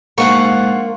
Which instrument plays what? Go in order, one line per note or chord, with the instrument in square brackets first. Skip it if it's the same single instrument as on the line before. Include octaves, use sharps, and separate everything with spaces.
[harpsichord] A#1 G#2 [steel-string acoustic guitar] A#3 [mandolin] F4 F#5 C#6